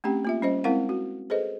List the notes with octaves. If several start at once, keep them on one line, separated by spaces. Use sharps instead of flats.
A3 C4 C#4 G4 G5
A#3 F4 E5
G3 C#4 C5 D#5
G#3 C4 E4 A#4 F5 F#5
F#4
G#4 A4 B4 C5 D#5